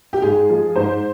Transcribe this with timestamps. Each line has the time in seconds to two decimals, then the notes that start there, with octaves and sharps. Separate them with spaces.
0.13 G4
0.22 G#2 G#4
0.49 F3 G#3
0.75 G#2 C5